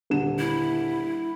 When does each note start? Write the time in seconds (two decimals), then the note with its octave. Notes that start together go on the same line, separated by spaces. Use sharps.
0.10 D#1 D3 E7
0.39 E4